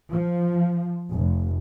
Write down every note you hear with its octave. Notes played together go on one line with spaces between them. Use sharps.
F3
F1